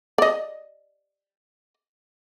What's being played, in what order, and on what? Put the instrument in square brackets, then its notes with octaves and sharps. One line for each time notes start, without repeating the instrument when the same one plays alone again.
[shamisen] D5 D#5